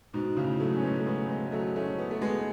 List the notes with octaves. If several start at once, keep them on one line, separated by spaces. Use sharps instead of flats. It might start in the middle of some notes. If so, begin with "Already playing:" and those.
G#2 B2
A2 C#3
F#3 A3
C#4
G#3 B3
A3
G#3 B3
G#3 B3
F#3 A3
A3 C#4
B3
A3
G#3 B3